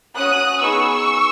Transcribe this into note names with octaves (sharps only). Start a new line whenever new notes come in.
C#4 F#4 D#6 F#6
B3 D#4 G#4 C#6 E6